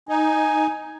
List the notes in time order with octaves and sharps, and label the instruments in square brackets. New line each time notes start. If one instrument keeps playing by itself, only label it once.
[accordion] D#4 [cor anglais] G#5